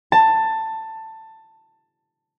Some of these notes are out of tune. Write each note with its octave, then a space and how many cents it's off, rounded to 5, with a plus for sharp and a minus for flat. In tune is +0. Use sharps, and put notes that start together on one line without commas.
A5 +15